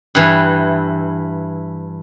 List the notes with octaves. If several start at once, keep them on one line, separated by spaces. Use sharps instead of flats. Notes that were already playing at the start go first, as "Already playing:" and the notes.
G2 E3